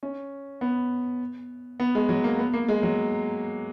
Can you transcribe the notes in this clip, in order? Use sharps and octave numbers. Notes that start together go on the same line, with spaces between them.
C#4
B3
B3
G#3
F#3
A#3
B3
A#3
G#3
F#3